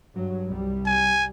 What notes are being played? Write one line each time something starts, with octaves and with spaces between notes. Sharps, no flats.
G2 F#3
C2 G3
G#5